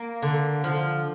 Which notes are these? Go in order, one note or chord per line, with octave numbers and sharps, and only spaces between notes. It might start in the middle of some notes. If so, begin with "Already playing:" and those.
Already playing: A#3
D3
F3